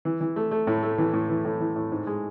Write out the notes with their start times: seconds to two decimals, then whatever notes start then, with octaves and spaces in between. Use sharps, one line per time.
0.05 E3
0.21 E3
0.36 A3
0.51 A3
0.67 A2
0.83 A3
0.98 E3
1.13 A2
1.29 E3
1.45 A2
1.60 E3
1.76 A2
1.92 G#2
2.07 G#3